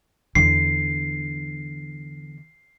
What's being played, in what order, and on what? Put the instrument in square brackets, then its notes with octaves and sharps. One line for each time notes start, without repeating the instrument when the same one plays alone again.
[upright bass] E2 D3 [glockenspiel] C7